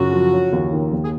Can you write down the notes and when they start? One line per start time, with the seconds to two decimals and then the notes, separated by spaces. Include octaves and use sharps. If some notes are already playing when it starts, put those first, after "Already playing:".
Already playing: F#2 C#3 F4 F#4
0.12 F3
0.33 C#4
0.53 D#2
0.73 D#3
0.93 D#2
1.04 G#4